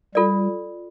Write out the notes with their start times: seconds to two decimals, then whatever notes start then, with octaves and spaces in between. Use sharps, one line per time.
0.15 G3 F4 A4 D5